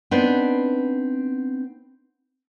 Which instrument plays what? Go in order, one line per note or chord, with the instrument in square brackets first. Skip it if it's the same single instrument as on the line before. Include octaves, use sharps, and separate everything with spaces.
[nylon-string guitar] B3 C4 D4 D#4